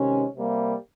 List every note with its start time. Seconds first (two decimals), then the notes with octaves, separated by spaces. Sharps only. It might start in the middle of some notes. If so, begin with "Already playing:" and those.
Already playing: C3 D#3 G#3 C#4
0.35 C3 G3 A#3